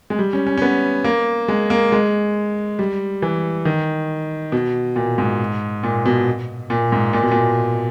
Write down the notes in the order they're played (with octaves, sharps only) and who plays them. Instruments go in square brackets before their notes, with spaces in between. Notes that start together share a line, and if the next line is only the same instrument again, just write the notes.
[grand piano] G#3
G3
C#4
C#4
C#4
B3
A#3
G#3
A#3
G#3
G3
E3
D#3
B2
A#2
G#2
A#2
B2
A#2
G#2
A#2
B2
A#2